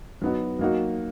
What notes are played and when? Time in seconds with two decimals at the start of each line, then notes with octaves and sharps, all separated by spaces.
0.22 F#3 B3 D#4 F#4
0.59 F#3 A#3 D#4 F#4